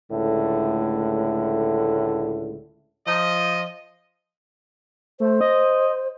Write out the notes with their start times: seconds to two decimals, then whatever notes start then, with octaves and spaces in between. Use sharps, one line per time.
0.11 C#2 A2 D3 A3
3.07 F3 D#5
5.20 A3 C5
5.41 D#5